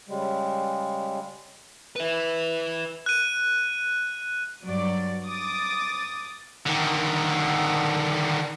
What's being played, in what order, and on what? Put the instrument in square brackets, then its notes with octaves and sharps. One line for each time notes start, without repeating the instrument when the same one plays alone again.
[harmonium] C#3 G3 G#3
[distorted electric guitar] B4 E5
[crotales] F#6 D#7
[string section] G2 F#3 D5
D6 D#6 A6
[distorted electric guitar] D3 D#3